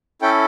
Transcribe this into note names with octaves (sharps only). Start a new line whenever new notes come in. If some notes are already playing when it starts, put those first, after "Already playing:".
C#4 E4 A4 G5